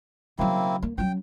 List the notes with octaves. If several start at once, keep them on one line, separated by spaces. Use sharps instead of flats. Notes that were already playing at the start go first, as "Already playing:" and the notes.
C#3 F#3 A#3 C4 E4
A#3
F#3 C#4 G5